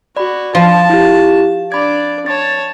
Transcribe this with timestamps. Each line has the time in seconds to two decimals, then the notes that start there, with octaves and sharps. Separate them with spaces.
0.17 F#4 D5 B5
0.55 F3 A5
0.90 E4 F4 G4
1.72 D4 D5 B5 G#6
2.26 C#5 A5 A6